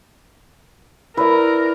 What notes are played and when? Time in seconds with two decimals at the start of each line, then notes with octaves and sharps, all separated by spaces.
1.17 E4 A#4 B4 D5 E5